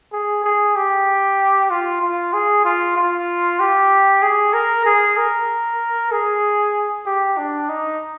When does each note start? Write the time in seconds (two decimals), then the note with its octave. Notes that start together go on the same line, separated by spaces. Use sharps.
0.13 G#4
0.44 G#4
0.76 G4
1.70 F4
2.02 F4
2.33 G#4
2.65 F4
2.97 F4
3.60 G4
4.22 G#4
4.53 A#4
4.86 G#4
5.17 A#4
6.12 G#4
7.06 G4
7.38 D4
7.69 D#4